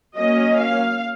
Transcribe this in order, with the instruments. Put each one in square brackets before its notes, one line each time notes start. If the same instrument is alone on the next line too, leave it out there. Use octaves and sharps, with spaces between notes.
[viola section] F#3 A#3 C#4 D#5
F5